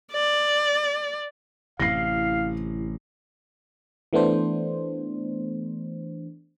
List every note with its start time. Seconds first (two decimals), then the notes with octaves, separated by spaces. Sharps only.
0.12 D5
1.80 A1 C3 E4 F5 A#6 C7
4.13 E3 A3 B3 D4 C5